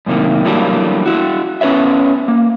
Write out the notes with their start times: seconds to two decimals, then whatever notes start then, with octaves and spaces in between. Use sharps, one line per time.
0.06 F#2 A2 C3 D#3 A#3
0.45 E3 F#3 G3 A3 A#3 D4
1.06 E4 F#4
1.61 B3 C#4 B4 C#5 E5
2.28 A#3